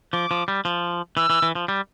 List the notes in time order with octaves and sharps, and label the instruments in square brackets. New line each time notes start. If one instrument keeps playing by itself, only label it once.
[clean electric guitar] F3 [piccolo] D6
[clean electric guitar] F3
G3
F3
[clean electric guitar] E3 [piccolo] E6
[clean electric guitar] E3
E3
F3
G3